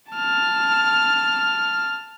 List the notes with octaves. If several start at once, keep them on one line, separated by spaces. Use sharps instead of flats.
A5 F6